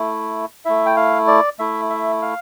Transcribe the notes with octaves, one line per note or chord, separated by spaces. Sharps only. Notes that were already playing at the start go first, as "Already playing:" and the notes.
Already playing: A3 E4
A3 E4 E5
G5
F5
D5
A3 E4 E5
E5
F5